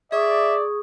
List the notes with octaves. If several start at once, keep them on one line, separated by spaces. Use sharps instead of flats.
G#4 D5 E5 C#6 D#6